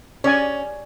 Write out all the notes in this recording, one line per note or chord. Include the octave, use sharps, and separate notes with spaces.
C#4 C#5 D5 G#5